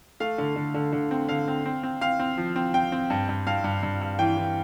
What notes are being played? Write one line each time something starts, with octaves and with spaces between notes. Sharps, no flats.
A3 F5
D3
D3
D3
D3
C4
D3 F5
C4
C4
C4
C4 F5
C4
F3
C4
C4 G5
C4
G2
G2
G2 F5
G2
G2
G2
E3 G5
E3